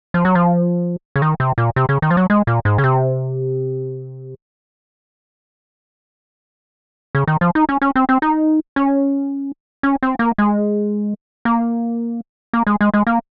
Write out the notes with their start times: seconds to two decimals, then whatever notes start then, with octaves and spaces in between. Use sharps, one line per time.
0.14 F3
0.25 F#3
0.35 F3
1.16 C#3
1.22 D#3
1.40 C3
1.58 A#2
1.76 C3
1.89 C#3
2.02 D#3
2.11 F3
2.17 F#3
2.30 G#3
2.47 A#2
2.65 G#2
2.78 C#3
2.84 C3
7.15 C#3
7.28 D#3
7.41 F3
7.55 D#4
7.69 C#4
7.82 C#4
7.96 C4
8.09 C4
8.22 D#4
8.76 C#4
9.83 C#4
10.03 C4
10.19 A#3
10.38 G#3
11.45 A#3
12.53 A#3
12.67 G#3
12.81 G#3
12.94 G#3
13.07 A#3